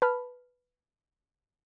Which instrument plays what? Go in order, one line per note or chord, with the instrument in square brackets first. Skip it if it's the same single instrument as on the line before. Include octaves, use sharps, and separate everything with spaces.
[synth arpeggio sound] B4 A5 B5 F6